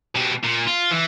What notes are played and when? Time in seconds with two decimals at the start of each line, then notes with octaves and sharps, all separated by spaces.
0.15 B2 G4
0.43 A#2
0.67 F4
0.91 E3